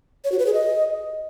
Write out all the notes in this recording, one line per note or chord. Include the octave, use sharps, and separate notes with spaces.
C#5
F#4
B4
G#4
D#5